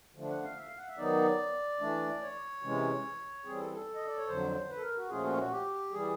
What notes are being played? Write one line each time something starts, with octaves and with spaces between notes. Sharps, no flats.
D3 F3 A3 D4
F#5
F5
E5
F5
F#5
E5
D#3 F#3 B3 D#4 D5
E3 A3 D4
C#5
C3 E3 G#3 C#4
E3 G3 C4 G#4
A4
A4
D#5
D5
C#5
F2 D3 F#3 C5
B4
A4
A#4
F#4
A#2 F3 A3 C#4 F4 G#4
F#4
F#4
G4
E3 G3 G#4